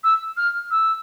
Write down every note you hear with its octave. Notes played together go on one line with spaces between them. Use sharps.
E6
F6
E6